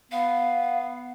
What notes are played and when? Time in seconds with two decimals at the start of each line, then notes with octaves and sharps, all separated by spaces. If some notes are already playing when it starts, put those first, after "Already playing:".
0.12 B3 F5